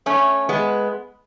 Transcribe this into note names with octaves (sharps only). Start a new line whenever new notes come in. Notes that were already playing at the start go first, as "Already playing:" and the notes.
A3 C#4
G#3 B3